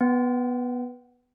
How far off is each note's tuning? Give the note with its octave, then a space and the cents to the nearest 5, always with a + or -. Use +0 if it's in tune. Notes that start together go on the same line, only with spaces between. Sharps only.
B3 -5 G5 -40